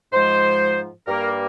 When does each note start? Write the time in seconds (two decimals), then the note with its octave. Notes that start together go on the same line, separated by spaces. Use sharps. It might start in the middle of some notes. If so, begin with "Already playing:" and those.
0.13 G#2 F3 G#3 C5
1.07 G2 G3 A#3 A#4